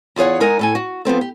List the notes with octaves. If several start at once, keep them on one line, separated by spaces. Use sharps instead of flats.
E2 F4 G#4 C#5 F#5
G#3 D#4 A#4 F#5 G#5
A2 A4 G#5
F#4
F3 B3 C4 A4
G4